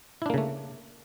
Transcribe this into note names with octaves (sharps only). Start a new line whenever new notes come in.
C#3 A3 A#3 D4 E4